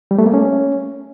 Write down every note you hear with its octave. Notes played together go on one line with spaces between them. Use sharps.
G3
A3
A#3
C#4